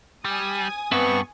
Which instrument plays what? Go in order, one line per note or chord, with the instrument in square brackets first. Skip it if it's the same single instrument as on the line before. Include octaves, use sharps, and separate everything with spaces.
[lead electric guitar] G3 [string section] G#5 D#6
[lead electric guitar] G2 [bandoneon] B3 C#6 [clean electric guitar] C4 B4 E5